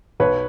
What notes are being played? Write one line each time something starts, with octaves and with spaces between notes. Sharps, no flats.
B1 B4 C#5